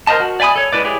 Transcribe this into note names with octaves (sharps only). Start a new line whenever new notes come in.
A#4 C5 D#5 A5
F#4
D5 E5 G#5 B5 D#6
A4 C#5
G#3 E4 B4 D5
E4 G4 G#4 C#5